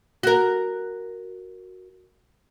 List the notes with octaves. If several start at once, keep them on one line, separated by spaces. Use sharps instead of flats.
F#4 A#4